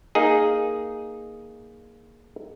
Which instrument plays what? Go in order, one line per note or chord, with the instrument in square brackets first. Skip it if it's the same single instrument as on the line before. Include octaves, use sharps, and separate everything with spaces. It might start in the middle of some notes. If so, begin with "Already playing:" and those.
[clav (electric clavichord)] A#3 D#4 G#4